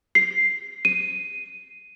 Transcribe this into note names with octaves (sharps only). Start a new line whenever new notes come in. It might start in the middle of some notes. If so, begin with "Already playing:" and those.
C7
D#7